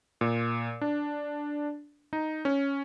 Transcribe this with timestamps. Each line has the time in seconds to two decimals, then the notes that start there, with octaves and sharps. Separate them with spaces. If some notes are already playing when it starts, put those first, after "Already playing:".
0.21 A#2
0.81 D4
2.13 D#4
2.45 C#4